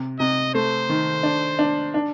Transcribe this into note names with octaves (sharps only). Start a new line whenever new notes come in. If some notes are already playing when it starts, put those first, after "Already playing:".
Already playing: C3
C3 D#5
A3 C5
D#3
D4
D4
D4